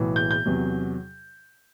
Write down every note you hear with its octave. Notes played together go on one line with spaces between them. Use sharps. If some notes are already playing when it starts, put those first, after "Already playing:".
Already playing: B1 A2 E3
G6
G6
E2 C3 F#3